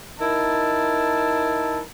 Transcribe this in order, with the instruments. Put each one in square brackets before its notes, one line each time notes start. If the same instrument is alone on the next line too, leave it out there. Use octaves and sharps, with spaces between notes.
[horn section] D#4 E4 A#4 A5